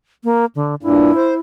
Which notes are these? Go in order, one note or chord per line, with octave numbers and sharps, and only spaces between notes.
A#3
D3
G2 A#2 E4
C5